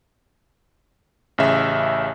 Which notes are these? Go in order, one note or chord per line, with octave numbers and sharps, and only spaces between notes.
A1 C#3 E5